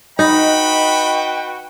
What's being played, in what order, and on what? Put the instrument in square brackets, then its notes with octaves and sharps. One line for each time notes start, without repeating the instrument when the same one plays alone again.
[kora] D#4 [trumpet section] F#4 B4 G5 [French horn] D#5 [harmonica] B5